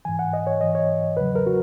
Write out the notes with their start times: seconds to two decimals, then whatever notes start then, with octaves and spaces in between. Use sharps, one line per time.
0.05 G#2 E3 G#5
0.19 F#5
0.33 D#5
0.47 C#5
0.61 G#2 E3 D#5
0.75 C#5
1.17 E2 C#3 F#3 B4
1.35 A#4
1.46 F#4